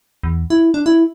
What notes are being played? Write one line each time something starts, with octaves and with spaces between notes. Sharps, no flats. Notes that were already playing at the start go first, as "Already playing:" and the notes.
E2
E4
D4
E4